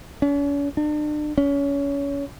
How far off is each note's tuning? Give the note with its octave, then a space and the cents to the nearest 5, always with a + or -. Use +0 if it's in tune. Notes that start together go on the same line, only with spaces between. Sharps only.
C#4 +45
D4 +40
C#4 +25